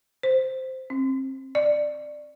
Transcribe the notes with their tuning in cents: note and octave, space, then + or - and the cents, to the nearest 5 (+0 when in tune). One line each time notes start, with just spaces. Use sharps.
C5 -5
C4 +30
D5 +15